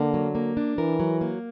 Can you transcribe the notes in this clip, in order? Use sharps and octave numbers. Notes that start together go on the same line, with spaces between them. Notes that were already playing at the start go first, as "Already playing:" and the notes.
Already playing: D3 A#3
F#3
A#3
D4
E3 A#4
F#3
A#3